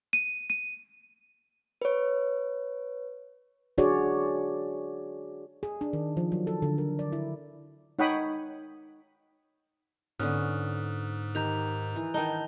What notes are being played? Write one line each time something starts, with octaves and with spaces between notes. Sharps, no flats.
D#7
D#7
B4 C#5
D4 F#4 G#4 C#5 D5
G#4
D4
D#3
F3
F#3
A4
D3
A#4
D5
E4
D#4 C#5 F#5 G5 B5 D#6
G#2 D3 B3 C#4 D#6 F6 F#6
D#3 G4 A#5 G6 F7
E3
D#3 D#4 A5 G7